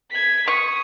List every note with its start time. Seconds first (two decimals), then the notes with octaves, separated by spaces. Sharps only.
0.11 G#6 B6
0.48 C#6 D#6